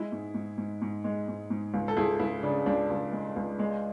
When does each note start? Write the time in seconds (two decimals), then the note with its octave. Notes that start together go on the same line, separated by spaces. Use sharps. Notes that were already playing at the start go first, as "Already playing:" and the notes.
Already playing: G#3 E4
0.12 G#2
0.34 G#2
0.58 G#2
0.82 G#2
1.04 G#3
1.28 G#2
1.50 G#2
1.74 C#2
1.88 A4
1.97 C#2 E4 G#4
2.20 C#2 E4
2.43 C#3 D4
2.66 C#2 D4
2.90 C#2
3.12 G#3
3.36 C#2
3.59 G#3